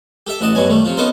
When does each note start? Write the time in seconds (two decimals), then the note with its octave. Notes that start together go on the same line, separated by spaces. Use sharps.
0.27 G4 A4 E5
0.41 A1 F#4 D#5 A5
0.55 G2 B2 F#3 G#5
0.70 D#3 G3 A3
0.84 C3 F3 F4
0.97 B3 C#4 D#4 A4 A#4 C5